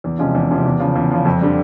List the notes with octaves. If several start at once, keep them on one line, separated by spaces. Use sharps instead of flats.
E2
C3 F3 G#3 C#4
E2
C3 F3 G#3 C#4
E2
C#3 F3
E2
C#3 F3
F2
D3 G3